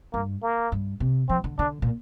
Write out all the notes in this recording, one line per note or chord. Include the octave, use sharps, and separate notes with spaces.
G2 A#3
A#3
G2
C3
F3 C4
D3
D3 D4
A#2